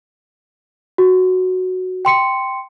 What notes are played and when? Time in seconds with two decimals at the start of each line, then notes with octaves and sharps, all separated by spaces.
0.98 F#4
2.05 G5 C6 C#7